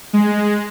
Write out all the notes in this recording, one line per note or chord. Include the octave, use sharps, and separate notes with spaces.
G#3